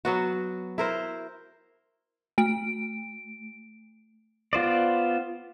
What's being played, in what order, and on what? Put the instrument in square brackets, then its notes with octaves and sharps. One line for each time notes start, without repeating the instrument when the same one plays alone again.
[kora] F#3 B3 F#4
E4 A#4 C5
[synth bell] A3 D7
[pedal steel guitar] B3 F4 C5 D5